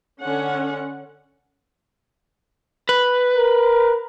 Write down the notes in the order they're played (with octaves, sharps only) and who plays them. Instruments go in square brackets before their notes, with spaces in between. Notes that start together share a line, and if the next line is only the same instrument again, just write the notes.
[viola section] D3 C#4 F#5
[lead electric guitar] B4
[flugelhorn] A#4